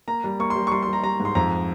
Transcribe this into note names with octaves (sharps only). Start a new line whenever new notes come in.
A#3 A#5
G3
A#3 C#6
C6
G3
C#6
G3 C6
C6
G3
A#5
G3 A#5
G#2
C6
F2 A#5